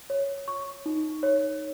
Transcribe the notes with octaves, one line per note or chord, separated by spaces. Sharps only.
C#5
C#6
D#4
C#5